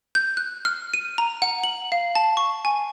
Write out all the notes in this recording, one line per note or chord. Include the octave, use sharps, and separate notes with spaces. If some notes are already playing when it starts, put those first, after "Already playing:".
G6
F#6
F6
D#7
A#5
F#5
F#7
F5
A5
C#6
G#5